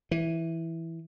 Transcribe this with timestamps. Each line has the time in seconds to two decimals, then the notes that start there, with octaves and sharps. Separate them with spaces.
0.11 E3